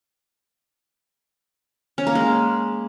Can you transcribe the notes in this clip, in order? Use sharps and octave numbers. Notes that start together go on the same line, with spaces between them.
C#4
A#3
G#3